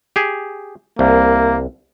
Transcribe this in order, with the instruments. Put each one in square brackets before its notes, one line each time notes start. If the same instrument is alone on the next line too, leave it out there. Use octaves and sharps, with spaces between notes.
[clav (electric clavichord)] G4 G#4
[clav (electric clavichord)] C2 [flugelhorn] A#3